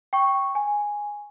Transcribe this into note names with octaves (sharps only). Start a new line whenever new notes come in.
G5 C#6
G#5